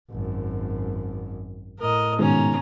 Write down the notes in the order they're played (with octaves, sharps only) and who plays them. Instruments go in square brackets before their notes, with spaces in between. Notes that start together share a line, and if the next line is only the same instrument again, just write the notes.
[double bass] G#1 F#2
[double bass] A2 [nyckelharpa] A#4 D#5
[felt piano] G#2 B2 D#3 [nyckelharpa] C#4 A#5